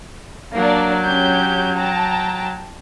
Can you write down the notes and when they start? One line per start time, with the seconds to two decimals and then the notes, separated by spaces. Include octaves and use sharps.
0.55 F#3 A#3 D4 D5
1.04 C#4 G4 G6
1.77 G5 A5 A#5